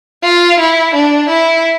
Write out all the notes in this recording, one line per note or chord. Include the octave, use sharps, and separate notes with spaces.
F4
E4
D4
E4